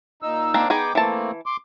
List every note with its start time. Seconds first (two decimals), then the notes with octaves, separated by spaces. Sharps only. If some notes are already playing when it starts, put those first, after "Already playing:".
0.23 A#2 D#4 E6
0.54 A#3 C4 D4
0.70 B3 D#4 G#4 G5 D6
0.95 E3 A3 A#3 C4 A5
1.46 C6 D6